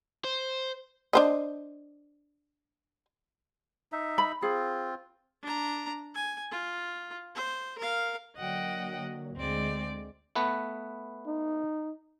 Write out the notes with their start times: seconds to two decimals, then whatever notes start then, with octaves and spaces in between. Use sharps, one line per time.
0.25 C5
1.13 D4 C5 D#5
3.92 D#4 E5
4.18 B5
4.42 C4 F4 G#4
5.43 D4 A#5
6.15 G#5
6.51 F4
7.35 C5
7.78 A#4 F5
8.36 D3 F#3 A#3 D#5 F#5 G5
9.37 D2 D3 G#3 C4 D5
10.36 A3 B3 B4
11.27 D#4